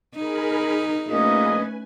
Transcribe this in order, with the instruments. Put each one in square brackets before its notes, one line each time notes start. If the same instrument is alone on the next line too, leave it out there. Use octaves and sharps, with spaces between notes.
[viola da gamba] D#4 [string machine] G#4 A#4 B5
[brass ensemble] A#1 A#3 D#5 [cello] A3 C#4 [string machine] B4 G#5